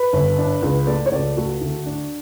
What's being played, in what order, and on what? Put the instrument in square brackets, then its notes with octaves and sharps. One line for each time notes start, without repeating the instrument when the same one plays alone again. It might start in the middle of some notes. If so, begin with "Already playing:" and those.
Already playing: [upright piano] B4
G1
D4
C#2
A3 D5
C#5
C#2 D5
A3 F#4
D2
D4